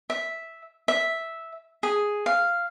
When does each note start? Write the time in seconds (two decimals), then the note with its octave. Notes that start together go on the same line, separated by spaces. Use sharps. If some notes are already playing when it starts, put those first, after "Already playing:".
0.10 E5
0.88 E5
1.83 G#4
2.26 F5